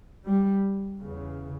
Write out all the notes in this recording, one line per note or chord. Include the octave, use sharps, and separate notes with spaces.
G3
E2 C#3